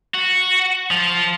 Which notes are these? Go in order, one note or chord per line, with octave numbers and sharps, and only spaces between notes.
F#4
F3